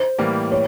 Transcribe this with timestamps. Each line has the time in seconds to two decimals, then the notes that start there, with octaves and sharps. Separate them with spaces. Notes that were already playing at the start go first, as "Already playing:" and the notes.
Already playing: C5
0.18 A2 E3 G3 A#3
0.52 C#5